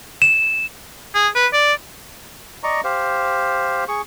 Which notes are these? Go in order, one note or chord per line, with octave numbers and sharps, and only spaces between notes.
E7
G#4
B4
D5
D5 D#5 A#5 C#6
G4 C5 F5
G#4 C#6